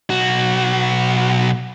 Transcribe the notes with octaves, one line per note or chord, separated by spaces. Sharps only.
B1 F#4